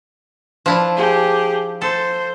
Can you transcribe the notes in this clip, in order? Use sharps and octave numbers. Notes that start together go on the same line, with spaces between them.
F3 D4 E4
G4 G#4
A4 C5